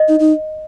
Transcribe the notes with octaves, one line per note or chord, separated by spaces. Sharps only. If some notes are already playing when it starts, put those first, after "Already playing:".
Already playing: D#5
D#4
D#4